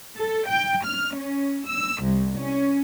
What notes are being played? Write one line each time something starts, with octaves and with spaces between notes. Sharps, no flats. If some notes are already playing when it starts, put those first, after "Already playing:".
A4
G5
F6
C#4
E6
C2
C#4